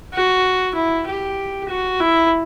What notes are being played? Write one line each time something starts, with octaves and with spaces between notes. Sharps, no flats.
F#4
E4
G4
F#4
E4